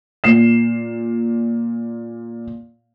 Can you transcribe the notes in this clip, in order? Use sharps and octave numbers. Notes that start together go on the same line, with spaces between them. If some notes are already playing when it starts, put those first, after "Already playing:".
A#2 C7 E7